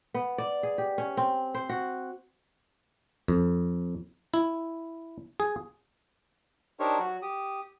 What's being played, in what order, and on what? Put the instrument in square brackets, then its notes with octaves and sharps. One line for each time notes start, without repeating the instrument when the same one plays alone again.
[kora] B3
D5
G#4
G4
C#4
C4
C5
F#4
[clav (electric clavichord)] F2
E4
G#4
[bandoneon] D4 D#4 G4 A#4 C5 C#5
F#3 F#4
G4 D#6